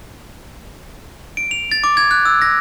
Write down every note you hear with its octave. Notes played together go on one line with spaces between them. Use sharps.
D7
F7
A6
D6
G#6
F#6
E6
A#6